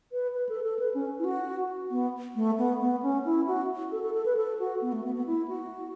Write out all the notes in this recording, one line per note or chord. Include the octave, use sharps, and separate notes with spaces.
B4
B4
A4
A4
B4
C#4
E4
F#4
B3
A3
B3
B3
C#4
E4
F#4
A4
A4
A4
B4
A4
F#4
B3
A3
B3
B3
E4
F#4